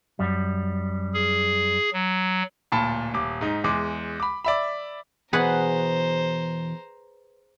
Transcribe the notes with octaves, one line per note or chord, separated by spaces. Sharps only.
F#2 G3
G#4
F#3
D1 A#2 A5 B5
D#1 D6
G#2 D#4
E2 G#3 D6
B5 D6
D5 E5 B5
E2 B2 G#4 B4 C5 F#5 A#5